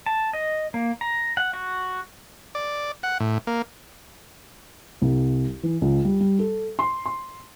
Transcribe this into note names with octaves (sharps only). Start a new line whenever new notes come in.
A5
D#5
A#3
A#5
F#5
F#4
D5
F#5
A2
A#3
C2
E3
C#2
G3
G3
A4
C6
C6